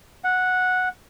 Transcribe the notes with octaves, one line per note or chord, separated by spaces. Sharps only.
F#5